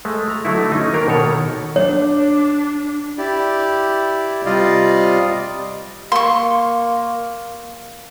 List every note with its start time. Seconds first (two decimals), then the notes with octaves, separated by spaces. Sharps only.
0.05 G#3 A3
0.30 A#5
0.45 D3 F#3 A3 D#4 E4
0.72 C#4 D#4
0.93 D#3 A#3 D4 A#4
1.08 B2 D#3 A4 C#5
1.76 D4 C#5
3.18 E4 G4 D5
4.46 C3 G3 F4 D5 D#5 F5
6.12 A#3 C6 C#6